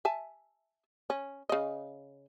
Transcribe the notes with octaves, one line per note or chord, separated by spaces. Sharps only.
E5 G#5 A5
C#4
C#3 D#5